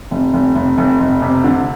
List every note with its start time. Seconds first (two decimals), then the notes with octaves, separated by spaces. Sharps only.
0.11 F1
0.33 F1
0.55 F1
0.78 F1
1.00 F1
1.22 C3
1.44 D3